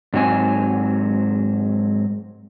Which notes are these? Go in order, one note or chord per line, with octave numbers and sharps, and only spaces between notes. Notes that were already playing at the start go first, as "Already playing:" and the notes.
G#2 F#3 C4 G#5